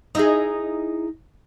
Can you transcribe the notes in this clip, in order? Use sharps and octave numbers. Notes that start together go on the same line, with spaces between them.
D#4 E4 G#4